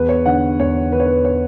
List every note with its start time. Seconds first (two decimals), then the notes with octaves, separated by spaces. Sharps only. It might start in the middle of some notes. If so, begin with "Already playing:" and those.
Already playing: E2 B4
0.09 C#5
0.26 D3 F#5
0.60 E2 C#5
0.92 D3 B4
1.00 C#5
1.06 B4
1.25 C#5